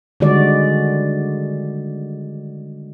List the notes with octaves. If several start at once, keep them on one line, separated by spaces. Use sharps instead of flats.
D3 D#3 G3 G#3 F#4 D5